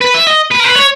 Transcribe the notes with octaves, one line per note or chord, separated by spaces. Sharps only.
B4
E5
D#5
B4
A#4
B4
C#5